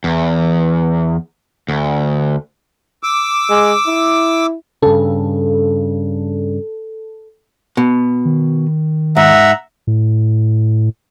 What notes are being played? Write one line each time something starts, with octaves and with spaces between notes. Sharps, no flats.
E2
D2
D6 E6
G#3
E4
G2 C#3 A4
B2
D#3
G#2 E5 F#5 A#5
A2